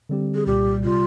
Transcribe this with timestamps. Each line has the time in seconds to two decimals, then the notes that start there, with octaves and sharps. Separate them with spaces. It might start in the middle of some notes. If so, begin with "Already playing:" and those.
0.09 D3 G3 C4 G4
0.34 G#4
0.46 C2 A#2 G3 G4
0.84 C3 G3 F4